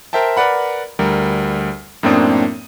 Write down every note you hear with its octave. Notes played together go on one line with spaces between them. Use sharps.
A#4 C5 E5 G5 A5
A#4 B4 D5 F#5 B5
D2 G3 A#4
F#2 A2 A#3 C4 D4 D#6